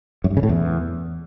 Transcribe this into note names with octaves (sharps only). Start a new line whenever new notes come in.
F#2
G2
C#3
A2
E2